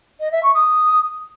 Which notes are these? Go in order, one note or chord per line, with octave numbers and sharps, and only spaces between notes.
D#5
E5
C#6
D#6